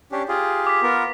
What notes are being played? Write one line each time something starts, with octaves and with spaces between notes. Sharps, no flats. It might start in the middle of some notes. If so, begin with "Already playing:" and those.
C#4 D4 G4
F4 G4 G#4
D6 B6
B3 F4 A#4